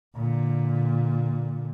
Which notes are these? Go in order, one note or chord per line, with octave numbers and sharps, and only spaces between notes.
A#2 D3